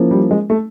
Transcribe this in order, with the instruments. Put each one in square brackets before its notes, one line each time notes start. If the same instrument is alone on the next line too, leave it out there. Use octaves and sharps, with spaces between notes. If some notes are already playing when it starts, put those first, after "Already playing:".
Already playing: [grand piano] F3 A#3 C#4 E4
[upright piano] G3
G#3
A3